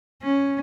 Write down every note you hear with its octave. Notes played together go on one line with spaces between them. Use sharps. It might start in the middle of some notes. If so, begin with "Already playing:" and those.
C#4